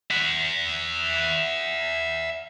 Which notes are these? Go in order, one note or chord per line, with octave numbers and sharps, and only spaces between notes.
E5 F#5